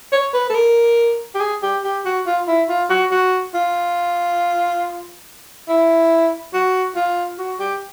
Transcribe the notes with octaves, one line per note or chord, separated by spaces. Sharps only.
C#5
B4
A4
A#4
G4
G#4
G4
G4
F#4
F4
E4
F4
F#4
F#4
F4
E4
F#4
F4
F#4
G4